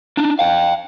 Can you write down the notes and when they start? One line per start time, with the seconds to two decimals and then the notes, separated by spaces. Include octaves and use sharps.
0.17 D4 D#4
0.39 F5 G5